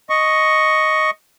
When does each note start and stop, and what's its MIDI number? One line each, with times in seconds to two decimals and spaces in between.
0.10 1.11 75
0.10 1.11 85